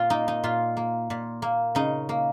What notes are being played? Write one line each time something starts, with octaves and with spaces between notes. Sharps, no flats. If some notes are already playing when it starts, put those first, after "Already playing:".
Already playing: A#2 F4
A#3 D#4
D#4
A#2 F4
A#3
A#2
A#3
C#3 D#4
A#3